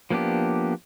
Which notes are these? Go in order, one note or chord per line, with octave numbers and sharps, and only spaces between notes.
F3 A#3 B3 D4 G4